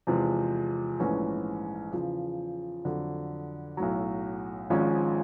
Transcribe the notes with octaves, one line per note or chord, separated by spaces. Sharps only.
E2 C3 F3 G#3
A#1 G#2 E3 A3 C#4
E2 C#3 F3
F2 D3 F#3
B1 A2 F#3
G#1 G#2 F3 G#3 C#4